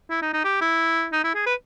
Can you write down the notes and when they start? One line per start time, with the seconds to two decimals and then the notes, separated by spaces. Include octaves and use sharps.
0.10 E4
0.22 D#4
0.33 D#4
0.44 G4
0.61 E4
1.12 D#4
1.24 E4
1.35 G#4
1.46 B4